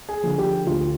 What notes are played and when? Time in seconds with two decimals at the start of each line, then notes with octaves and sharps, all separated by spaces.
0.09 G#4
0.23 D3 F3
0.38 G4
0.66 D2 F4